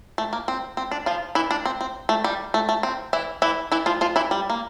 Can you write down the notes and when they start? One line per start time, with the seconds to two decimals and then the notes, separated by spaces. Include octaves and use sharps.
0.18 A3
0.33 A#3
0.48 C4
0.77 C4
0.91 D4
1.06 F3 F4
1.35 E3 E4
1.51 D4
1.65 C4
1.81 C4
2.09 A3
2.24 G3
2.54 A3
2.69 A3
2.83 C4
3.13 E3 E4
3.42 E3 E4
3.72 E3 E4
3.86 F3 F4
4.01 F3 F4
4.16 E3 E4
4.31 G3
4.50 A#3